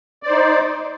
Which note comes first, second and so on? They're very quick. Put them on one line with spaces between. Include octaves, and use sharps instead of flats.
D5 C5 D#4